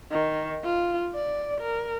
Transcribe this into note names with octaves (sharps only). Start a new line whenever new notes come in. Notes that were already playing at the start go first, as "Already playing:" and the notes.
D#3
F4
D5
A#4